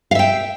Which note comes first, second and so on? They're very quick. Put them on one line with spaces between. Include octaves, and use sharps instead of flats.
F5 E5 G5